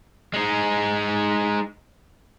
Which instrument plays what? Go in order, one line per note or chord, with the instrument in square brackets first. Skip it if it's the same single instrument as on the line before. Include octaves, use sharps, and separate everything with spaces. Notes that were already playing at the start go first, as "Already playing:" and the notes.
[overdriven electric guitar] G#3 D#4